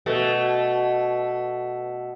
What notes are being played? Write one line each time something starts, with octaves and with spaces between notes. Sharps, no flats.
B2 A3